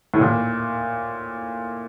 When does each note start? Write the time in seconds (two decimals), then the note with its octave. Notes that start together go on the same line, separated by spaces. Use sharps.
0.14 A2
0.21 A#2